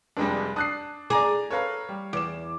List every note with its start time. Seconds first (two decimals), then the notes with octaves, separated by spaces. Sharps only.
0.17 F1 F2 G3 G#3 D4
0.56 D4 A5 D#6 F#6 C7
1.10 G#4 D5 A#5 D6
1.50 A4 B4 C#5 F5 A#5
1.89 G3
2.13 E2 D6 E7